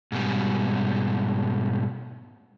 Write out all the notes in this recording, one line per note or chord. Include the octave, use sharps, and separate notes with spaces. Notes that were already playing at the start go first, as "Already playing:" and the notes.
G#2 B2 G3